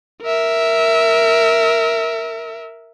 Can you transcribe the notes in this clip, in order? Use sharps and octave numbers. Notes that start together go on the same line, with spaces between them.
A#4 E5